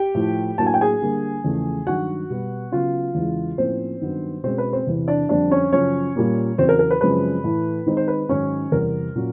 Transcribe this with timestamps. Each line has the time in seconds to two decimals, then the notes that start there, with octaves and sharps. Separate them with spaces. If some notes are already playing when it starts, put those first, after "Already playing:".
Already playing: G4 G5
0.15 A2 F3 A3
0.58 A2 F#3 A#3 D4 A5
0.67 G#5
0.74 G5
0.81 G#4 G#5
1.01 D3 G3 A#3
1.44 E2 C#3 F3 A3
1.86 G2 D#3 F#3 F#4 F#5
2.30 B2 G3 B3
2.72 C#3 F#3 B3 F4 F5
3.15 E2 C#3 E3 G#3
3.58 A2 F3 A#3 C4 C#4 C5
4.01 G2 D#3 F#3 B3
4.44 B2 G#3 C4 C#4 C5
4.58 B4
4.73 C4 C5
4.87 E2 C3 E3
5.08 D4 D5
5.29 F2 D3 G3 C4 D4 D5
5.51 C#4 C#5
5.72 F#2 C#3 F3 C#4 C#5
6.16 A#2 G3 A#3 C#4
6.58 E2 C#3 F#3 C4 C5
6.69 A#4
6.79 A#4
6.91 B4
7.01 F#2 C#3 F3 G#3 C4 B4
7.44 A2 E3 A3
7.86 D#3 G#3 C4 D#4
7.97 C5
8.08 B4
8.29 G#2 D#3 F#3 C#4 C#5
8.72 E2 C3 E3 G3 A#4
9.15 A#2 F#3 C#4